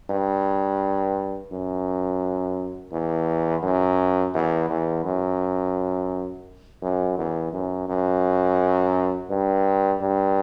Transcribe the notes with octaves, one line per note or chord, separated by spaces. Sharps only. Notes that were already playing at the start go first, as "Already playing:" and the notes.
G2
F#2
E2
F#2
E2
E2
F#2
F#2
E2
F#2
F#2
G2
G2